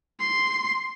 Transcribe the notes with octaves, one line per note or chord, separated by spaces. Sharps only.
C6